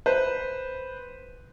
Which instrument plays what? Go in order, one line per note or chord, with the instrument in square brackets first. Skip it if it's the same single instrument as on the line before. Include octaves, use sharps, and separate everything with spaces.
[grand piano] B4 C5